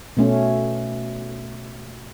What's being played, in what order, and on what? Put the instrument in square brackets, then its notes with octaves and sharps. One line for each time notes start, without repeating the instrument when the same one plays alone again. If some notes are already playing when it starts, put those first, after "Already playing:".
[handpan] B2 A3 C#4